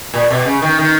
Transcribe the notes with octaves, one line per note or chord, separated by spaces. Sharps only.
A#2
B2
C#3
D#3
D#3